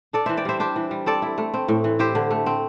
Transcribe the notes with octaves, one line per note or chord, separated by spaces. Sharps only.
D4 A4 D5
E3 C5 E5
D5 G5
G3 C5 E5
D4 G4 C5
E3
G3
C4 A4 D5
E4
A3
C4
A2
E3
E4 G4 C5
D3
A3
C4